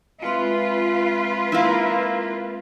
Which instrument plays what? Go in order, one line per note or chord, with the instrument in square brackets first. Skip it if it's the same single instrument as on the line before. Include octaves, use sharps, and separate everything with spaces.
[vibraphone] G#3 C4 E5 [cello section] F4 B4
[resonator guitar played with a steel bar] A#3 E4